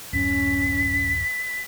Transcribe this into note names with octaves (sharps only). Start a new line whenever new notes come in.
D1 F#2 C#4 B6